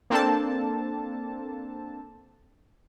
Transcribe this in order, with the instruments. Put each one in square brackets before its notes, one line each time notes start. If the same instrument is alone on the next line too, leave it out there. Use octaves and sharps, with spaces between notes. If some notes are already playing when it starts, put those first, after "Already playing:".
[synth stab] A#3 C4 D4 A4 A5